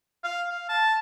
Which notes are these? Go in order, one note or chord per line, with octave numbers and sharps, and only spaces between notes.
F5
F5
A5